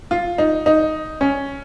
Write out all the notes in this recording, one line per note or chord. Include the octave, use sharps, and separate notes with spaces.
F4
D#4
D#4
C#4